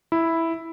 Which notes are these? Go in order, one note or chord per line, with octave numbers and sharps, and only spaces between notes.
E4